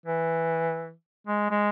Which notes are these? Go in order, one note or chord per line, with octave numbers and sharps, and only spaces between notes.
E3
G#3
G#3